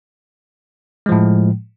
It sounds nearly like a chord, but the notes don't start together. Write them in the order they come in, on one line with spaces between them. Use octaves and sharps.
G#3 F3 A2